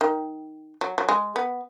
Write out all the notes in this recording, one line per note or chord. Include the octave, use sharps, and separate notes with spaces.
D#3
F#3
F#3
G#3
B3